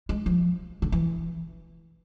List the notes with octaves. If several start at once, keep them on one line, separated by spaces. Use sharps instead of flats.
G#3
F3
D3
E3